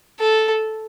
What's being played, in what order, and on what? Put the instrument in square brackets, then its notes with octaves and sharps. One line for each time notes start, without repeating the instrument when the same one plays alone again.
[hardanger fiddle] A4